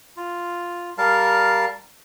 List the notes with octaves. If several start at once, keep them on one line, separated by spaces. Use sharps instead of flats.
F4
G3 A#4 F5 A5